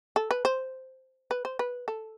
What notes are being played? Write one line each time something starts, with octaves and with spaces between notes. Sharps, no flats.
A4
B4
C5
B4
C5
B4
A4